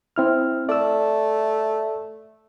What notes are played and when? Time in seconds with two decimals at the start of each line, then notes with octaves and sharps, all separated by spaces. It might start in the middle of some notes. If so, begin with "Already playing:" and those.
0.16 C4 E4 F6
0.69 A3 D5 E6